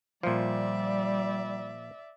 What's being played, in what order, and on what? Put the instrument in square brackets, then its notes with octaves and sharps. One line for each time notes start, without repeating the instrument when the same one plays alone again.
[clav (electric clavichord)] A#2 F3 [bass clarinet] G3 [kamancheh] D5 E5